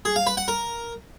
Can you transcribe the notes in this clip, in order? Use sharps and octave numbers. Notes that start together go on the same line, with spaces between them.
G#4
F5
B4
F#5
A#4